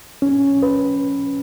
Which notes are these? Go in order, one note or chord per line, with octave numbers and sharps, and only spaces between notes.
C#4
B4